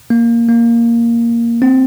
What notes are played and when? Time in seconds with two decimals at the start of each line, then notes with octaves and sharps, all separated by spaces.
0.10 A#3
0.48 A#3
1.62 C4